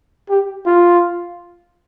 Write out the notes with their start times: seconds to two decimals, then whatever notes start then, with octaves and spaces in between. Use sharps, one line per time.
0.29 G4
0.66 F4